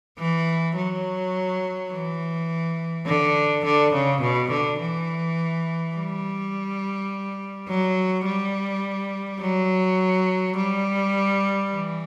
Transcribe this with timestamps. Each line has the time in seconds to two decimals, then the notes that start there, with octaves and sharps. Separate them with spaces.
0.18 E3
0.76 F#3
1.91 E3
3.06 D3
3.65 D3
3.93 C#3
4.21 B2
4.51 D3
4.80 E3
5.95 G3
7.68 F#3
8.25 G3
9.41 F#3
10.57 G3
11.71 E3